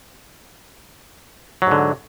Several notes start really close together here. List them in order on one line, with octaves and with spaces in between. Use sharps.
F#3 G#2 D3